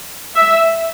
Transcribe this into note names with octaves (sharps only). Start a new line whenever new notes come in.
E5